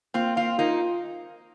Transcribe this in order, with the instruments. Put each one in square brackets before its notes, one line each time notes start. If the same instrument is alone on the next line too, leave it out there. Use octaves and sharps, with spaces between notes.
[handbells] A#3 [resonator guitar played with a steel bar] C4 F4
[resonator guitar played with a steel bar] C4 F4 [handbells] F5
[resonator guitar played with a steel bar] A#3 D#4 [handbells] F4